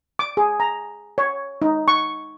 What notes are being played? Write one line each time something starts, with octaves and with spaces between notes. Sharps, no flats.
D6
G#4
A#5
C#5
D#4
C#6